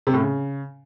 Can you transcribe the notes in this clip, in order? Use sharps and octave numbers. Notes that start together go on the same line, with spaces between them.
C3
A2
C#3